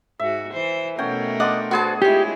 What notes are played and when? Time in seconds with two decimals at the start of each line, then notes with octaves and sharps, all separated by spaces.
0.19 G#2 F#4 E5
0.53 E3 C5
0.98 B2 A3 C#4 A#4 F#5 G5
1.40 D4 D5 D#5 F#5 C6 D6
1.71 B3 F#4 G#4 C5 A5
2.02 G#3 E4 F4 G4 C#5 G#5